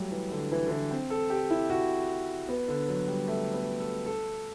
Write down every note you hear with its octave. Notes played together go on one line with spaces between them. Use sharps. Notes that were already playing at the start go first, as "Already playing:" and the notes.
Already playing: F#3 G3 A3
E3
D3
E3
D3
E3
C4
A4
G4
E4
F#4
B3
D3
F#3
G3
A3
B3
A4
A4